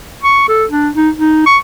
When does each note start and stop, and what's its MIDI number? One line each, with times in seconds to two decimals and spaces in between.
0.23 0.46 85
0.48 0.64 69
0.70 0.90 62
0.95 1.10 63
1.16 1.42 63
1.46 1.57 85